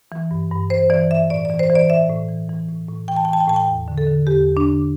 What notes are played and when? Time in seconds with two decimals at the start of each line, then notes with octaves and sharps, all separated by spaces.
0.12 E3
0.31 G2
0.51 G2
0.70 E3 C5
0.90 E3 D5
1.11 G2 E5
1.30 A2 D5
1.45 D5
1.50 E3
1.59 C5
1.70 E3
1.75 D5
1.90 A2 E5
2.10 A2
2.29 E3
2.49 E3
2.69 A2
2.88 A2
3.08 E3 G5
3.16 A5
3.25 G5
3.28 E3
3.33 A5
3.40 G5
3.48 A2 A5
3.56 G5
3.68 E2
3.88 D3
3.98 A4
4.07 D3
4.27 E2 G4
4.47 E2
4.57 D4
4.66 D3